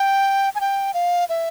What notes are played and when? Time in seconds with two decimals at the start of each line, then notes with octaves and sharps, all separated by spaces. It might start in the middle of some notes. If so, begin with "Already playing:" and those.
Already playing: G5
0.55 G#5
0.61 G5
0.94 F5
1.29 E5